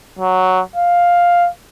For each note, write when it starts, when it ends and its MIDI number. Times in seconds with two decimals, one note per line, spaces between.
0.19 0.60 54
0.76 1.48 77